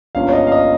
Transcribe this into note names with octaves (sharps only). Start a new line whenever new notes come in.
G1 G2 F3 A#3 C#4 F5
C#5
D#5
F5
D#5